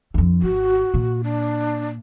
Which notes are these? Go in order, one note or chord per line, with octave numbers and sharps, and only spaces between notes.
F2 D3
G#1 F#4
A#2
D4